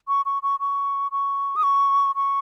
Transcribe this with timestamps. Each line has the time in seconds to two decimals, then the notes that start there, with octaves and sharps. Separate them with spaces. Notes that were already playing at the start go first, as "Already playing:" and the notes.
0.08 C#6
0.26 C#6
0.43 C#6
0.60 C#6
1.12 C#6
1.56 D#6
1.63 C#6
2.16 C#6